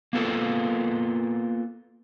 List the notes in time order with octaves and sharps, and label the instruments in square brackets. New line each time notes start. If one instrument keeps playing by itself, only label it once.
[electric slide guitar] A#3 B3 F4 A4 A#4